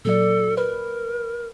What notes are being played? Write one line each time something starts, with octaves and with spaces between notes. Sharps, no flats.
A#2 F#3 A4 D5
A#4 B4